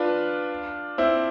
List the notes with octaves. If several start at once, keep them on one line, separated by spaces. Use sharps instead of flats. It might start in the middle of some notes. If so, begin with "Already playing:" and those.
Already playing: D4 F4 B4
C4 E4